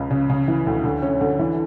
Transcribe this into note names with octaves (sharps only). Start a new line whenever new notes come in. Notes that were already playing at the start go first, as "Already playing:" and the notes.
Already playing: C#2 C#3
C#3
C#3
E3
D2
D3
C#4
D3
E3